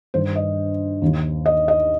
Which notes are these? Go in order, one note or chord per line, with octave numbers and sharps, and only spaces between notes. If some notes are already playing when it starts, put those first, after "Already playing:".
G2 D#3 C5
D#5
D#2 D#3
D#5
D#5